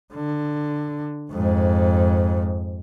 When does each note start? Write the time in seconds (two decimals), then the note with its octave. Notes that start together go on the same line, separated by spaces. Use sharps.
0.14 D3
1.32 F2 G#2